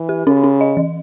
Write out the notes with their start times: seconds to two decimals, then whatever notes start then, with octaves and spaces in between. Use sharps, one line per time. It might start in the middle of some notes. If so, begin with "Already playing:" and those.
Already playing: E3
0.09 G4
0.27 C#3 C#4
0.44 C#4
0.61 D#5
0.77 E3